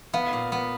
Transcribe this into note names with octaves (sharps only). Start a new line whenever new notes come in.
B3 F5
A#2
B3